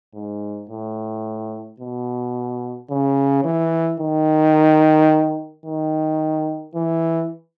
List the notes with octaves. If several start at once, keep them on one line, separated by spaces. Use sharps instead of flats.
G#2
A2
B2
C#3
E3
D#3
D#3
E3